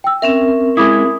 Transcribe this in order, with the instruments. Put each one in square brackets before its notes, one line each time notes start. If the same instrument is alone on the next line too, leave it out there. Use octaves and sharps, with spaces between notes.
[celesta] G5 E6
[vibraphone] C4 C#4 A#4 [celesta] E5
[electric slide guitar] G#3 E4 [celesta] B5 D6 D#6